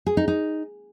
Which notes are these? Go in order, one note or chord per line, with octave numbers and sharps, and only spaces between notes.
G#4
D#4
D#4